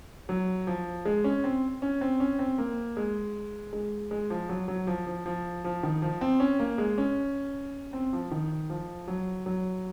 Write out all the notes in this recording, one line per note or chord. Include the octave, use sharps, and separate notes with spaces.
F#3
F3
G#3
C#4
C4
C#4
C4
C#4
C4
A#3
G#3
G#3
G#3
F3
F#3
F#3
F3
F3
F3
F3
D#3
F3
C4
C#4
A#3
G#3
C#4
C4
F3
D#3
F3
F#3
F#3